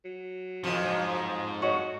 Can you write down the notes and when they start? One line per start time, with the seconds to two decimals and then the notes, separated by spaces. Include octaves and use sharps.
0.05 F#3
0.64 F2 C#3 E3 F3
0.84 G#2
1.62 F#4 C#5 D#5 C#6